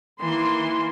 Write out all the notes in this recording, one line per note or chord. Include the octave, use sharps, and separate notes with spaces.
D#3 E3 A#3 C6